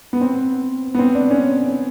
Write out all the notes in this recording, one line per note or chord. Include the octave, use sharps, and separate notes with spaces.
B3
C4
B3
C4
D4
C#4